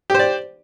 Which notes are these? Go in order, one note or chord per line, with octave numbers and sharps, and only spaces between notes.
G4 C5 D5